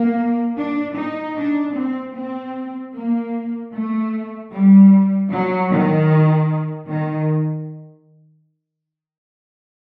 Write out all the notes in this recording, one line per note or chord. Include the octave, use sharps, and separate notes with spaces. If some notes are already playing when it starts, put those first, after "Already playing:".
Already playing: A#3
D4
D#4
D4
C4
C4
A#3
A3
G3
F#3
D#3
D#3